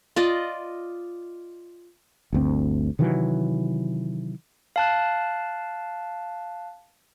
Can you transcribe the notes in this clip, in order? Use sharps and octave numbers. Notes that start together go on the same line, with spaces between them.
F4 D5 D#5
G1 D2 C4
C3 D#3 E3 F#3
F5 A5 F#6